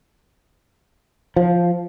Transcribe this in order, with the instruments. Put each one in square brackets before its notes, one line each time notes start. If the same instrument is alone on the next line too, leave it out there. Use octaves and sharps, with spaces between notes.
[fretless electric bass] F3